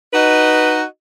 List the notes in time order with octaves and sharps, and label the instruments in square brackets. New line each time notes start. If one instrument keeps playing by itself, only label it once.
[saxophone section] D#4 F#4 B4 D#5